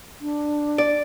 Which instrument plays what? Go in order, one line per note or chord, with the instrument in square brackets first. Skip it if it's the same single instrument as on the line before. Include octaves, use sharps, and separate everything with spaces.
[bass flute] D4
[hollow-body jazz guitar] D5